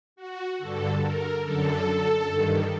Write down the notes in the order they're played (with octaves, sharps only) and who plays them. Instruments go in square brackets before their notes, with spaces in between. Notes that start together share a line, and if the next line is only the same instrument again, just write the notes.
[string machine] F#4
G2 D3 A4
A#4
F#2 D3 A4
G2 D#3